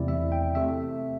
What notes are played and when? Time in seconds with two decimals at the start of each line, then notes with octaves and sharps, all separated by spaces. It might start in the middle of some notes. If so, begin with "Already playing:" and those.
Already playing: E2 C3 A3 E4 D5
0.08 E5
0.32 G5
0.55 C3 A3 E5